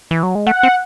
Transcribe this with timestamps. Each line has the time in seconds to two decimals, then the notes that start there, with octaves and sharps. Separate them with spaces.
0.11 E3
0.23 F#3
0.35 G#3
0.47 A3 F#5
0.63 C4